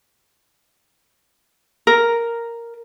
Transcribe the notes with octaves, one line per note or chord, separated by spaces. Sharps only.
A#4